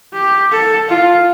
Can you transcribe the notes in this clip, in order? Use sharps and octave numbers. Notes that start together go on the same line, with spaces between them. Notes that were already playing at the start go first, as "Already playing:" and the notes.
G4
A4
F4